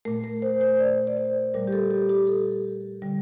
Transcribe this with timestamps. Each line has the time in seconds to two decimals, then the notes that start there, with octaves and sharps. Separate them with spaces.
0.05 A#2 A3 A#4
0.24 A#4
0.42 C5
0.61 C5
0.80 D5
1.07 D5
1.17 C5
1.54 A#2 G3 A#4
1.67 G4
1.73 A4
1.91 G4
2.09 G4
2.27 A4
3.02 D3 G3